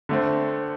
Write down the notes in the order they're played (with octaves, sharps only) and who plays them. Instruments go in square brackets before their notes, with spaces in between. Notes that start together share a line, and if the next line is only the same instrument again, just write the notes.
[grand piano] D3 A3 C4